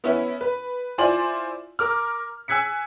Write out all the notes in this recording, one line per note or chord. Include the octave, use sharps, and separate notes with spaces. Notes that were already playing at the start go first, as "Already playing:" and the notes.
B3 C#4 E4
B4
E4 F4 C5 D5 G#5 F#7
A#4 D6 F6
G#5 E6 F#6 G#6 B6 C#7